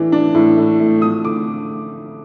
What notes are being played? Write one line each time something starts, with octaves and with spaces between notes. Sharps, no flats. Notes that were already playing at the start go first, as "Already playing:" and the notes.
Already playing: A2 E3 D4
D4
A2
A3
A3
F3 D#6
D3 D6